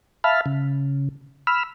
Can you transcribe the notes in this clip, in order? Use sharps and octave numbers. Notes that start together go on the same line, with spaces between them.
E5 F5 A5 B5 F6
C#3
B5 E6 F6